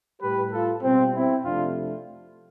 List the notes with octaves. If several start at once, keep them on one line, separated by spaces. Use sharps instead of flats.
A2 G3 G4 B4
F4 A4
B2 G3 C4
C4 E4
F2 C3 F3 A3 D4 F4